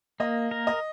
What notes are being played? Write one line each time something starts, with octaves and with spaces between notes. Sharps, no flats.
A#3 D#5
A#4
D#5